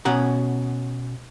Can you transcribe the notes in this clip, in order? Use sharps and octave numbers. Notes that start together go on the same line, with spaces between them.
B2 C#4 F#5 A#5